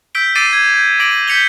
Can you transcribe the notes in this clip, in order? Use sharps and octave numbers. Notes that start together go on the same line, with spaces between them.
E6 G6 B6 D7 G7
D6 E6 A6 C7 D7 D#7
G#6
G6
D6 A#6 D7 F#7
G6 B6 C#7 F7 G7